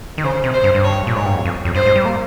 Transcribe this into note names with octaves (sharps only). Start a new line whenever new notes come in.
D#3
C#3 C5
C3
C5
G2
G2
C#5
A#2
G#2 C#5
G2
F2
F2
F2
G2 C5
G#2
G3
A#3